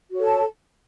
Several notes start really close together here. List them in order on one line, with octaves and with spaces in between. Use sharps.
F#4 C#5 A4 A5